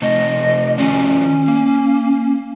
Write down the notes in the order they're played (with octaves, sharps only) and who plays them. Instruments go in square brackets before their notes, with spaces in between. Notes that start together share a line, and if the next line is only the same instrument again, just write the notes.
[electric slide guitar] C3 A3 C4 [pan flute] D#5
[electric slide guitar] D#3 F3 D5 [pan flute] C#4
[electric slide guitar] A#3